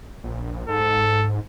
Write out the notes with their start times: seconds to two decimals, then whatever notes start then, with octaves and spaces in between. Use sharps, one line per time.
0.24 A#1
0.68 G#2 A4